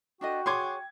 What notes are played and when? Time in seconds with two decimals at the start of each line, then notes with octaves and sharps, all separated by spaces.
0.21 D4 F#4 A4 D#5 G5
0.46 G#4 C#5 C6 D6 G#6